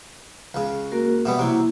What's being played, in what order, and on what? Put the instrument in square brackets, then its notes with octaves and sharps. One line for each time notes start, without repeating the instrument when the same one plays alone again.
[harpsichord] C#2 C#3
[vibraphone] A#3 F#4 A#4
[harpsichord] B2 G3 B3 [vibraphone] E5 F#5
[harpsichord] C3 F#3 [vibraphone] A#3 E4